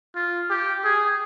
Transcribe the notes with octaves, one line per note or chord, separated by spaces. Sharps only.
F4
G4
G#4